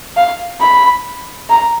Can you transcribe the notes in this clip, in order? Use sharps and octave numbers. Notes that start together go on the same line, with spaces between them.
F5
B5
A#5